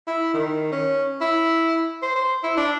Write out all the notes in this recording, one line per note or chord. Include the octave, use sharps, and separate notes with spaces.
E4
D#3
C#4
E4
C5
C5
E4
D4